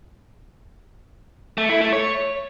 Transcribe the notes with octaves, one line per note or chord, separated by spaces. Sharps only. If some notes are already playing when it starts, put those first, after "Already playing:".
A3
E4
A3
C#5